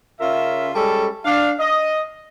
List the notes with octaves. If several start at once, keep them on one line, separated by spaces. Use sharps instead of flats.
C#3 C#4 F4 A#4 E5
G3 G#3 C#4 A4
D4 F5
D#5